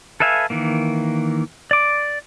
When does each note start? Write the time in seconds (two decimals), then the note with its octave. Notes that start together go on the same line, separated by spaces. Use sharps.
0.20 A4 B4 E5 F5 G#5
0.50 D#3 E3 A#3
1.71 D5 D6